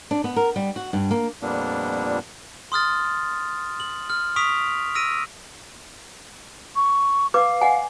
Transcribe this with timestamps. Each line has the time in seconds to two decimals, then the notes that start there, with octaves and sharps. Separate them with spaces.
0.11 D4
0.24 B3
0.36 A#4
0.56 G3
0.76 F#4
0.93 G2
1.11 A#3
1.42 F2 A#2 G3 A#3 B3 D4
2.72 C6 D#6 F6 A6
3.80 F#7
4.10 F6
4.36 C#6 D#6 B6 D7 F7
4.95 E6 A#6 D7 D#7
6.76 C#6
7.34 B4 F5 D6
7.61 D#5 F#5 G#5